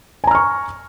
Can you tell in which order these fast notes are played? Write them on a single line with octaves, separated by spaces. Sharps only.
G#5 A#5 F6 C#6